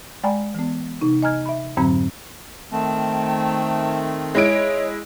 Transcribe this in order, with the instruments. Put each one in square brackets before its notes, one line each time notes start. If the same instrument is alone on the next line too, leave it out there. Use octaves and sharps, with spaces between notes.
[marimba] G#3 D5 G5 G#5 A#5 B5
E3 B3
C3 D#4
D#5 G#5 A#5 F6 G#6
E5 B5
F2 G#2 D3 F#3 C4 B5
[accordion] D#3 A3 C4 [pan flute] A5
[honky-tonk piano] G#3 E4 D7 [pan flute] C#5